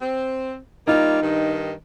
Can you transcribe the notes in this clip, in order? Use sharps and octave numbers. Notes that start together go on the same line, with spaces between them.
C4
G3 A#3 D#4 F4
G2 D#3